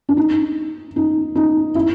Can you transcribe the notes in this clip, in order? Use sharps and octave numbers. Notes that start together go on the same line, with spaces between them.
D4
D#4
D#4
D#4
E4